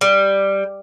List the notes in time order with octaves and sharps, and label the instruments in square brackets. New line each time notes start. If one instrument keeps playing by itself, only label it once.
[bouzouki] G3